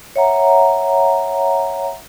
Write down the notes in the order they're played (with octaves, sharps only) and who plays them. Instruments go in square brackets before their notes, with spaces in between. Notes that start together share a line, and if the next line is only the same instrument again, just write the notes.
[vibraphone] C#5 E5 F#5 A#5